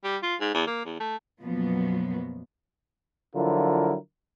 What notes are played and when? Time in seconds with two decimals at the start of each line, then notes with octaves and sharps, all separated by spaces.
0.04 G3
0.23 F4
0.40 G#2
0.54 E2
0.67 A#3
0.85 E2
1.00 A3
1.42 F#2 B2 F3 F#3 A#3 B3
3.35 D3 F3 F#3 E4 F4 A#4